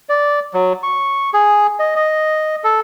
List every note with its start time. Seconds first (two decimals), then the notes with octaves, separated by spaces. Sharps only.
0.09 D5
0.54 F#3
0.83 C#6
1.34 G#4
1.79 D#5
1.96 D#5
2.64 A4